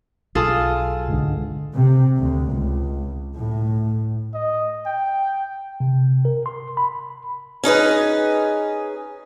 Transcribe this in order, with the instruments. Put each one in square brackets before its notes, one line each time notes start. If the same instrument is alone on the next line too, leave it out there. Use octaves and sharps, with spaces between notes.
[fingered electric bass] B1 [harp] F4 G#4 A4
[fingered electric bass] C#2 G#2 D3
[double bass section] C3
D2
C#2
A2
[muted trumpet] D#5
G5
[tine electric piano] C3
A#4
C6
B5
[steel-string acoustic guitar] C#4 D#4 G#4 B4